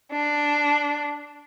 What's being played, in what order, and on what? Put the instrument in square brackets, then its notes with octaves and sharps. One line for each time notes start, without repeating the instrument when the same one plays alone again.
[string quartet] D4